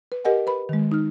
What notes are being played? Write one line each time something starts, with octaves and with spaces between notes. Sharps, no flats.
B4
G4 A#4 D#5 F#5 G#5
B4 B5
D#3 G#3
D#4 F6